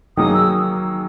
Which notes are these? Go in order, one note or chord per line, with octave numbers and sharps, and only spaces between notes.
D#3 F#3 A#3 D#4 G#4 D#6
E6